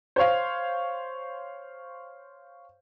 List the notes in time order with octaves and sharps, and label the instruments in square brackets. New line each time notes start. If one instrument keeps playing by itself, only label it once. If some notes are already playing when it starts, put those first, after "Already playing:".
[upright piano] C5 C#5 F5